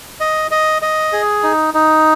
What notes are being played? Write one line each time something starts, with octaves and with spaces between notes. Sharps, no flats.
D#5
D#5
D#5
G#4
D#4
D#4